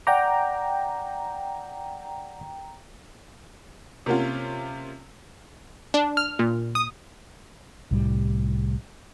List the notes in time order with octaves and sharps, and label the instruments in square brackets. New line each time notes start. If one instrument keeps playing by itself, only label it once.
[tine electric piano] D5 F#5 D6 [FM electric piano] G5 A#5
[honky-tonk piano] C3 A#3 C#4 F4
[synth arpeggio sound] D4
F6
A#2
D#6
[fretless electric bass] C2 A2 G3